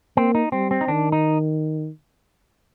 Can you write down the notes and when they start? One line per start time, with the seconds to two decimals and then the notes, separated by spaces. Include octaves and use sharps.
0.17 A#3 C4
0.35 D#4
0.52 G3 C4
0.71 C4
0.81 D#4
0.88 D#3 D4
1.12 D#4